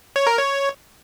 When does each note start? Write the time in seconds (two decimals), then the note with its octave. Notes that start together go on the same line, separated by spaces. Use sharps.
0.16 C#5
0.27 A#4
0.37 C#5